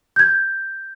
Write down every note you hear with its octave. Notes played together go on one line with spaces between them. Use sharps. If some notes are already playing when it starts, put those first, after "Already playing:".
G6 G#6